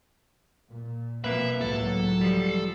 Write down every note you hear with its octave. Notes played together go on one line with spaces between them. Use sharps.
A#2
B2 F3 A#3 C4 B4 E5
C#2 A2 F#3 A4
F3 G3